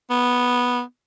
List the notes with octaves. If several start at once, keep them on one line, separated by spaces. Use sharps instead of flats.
B3